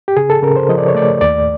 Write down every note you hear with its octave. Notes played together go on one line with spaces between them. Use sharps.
G4
C#3 G#4
A4
C#3 A#4
C5
F3 D#5
D5
C#5
A3 D5
D#2 D5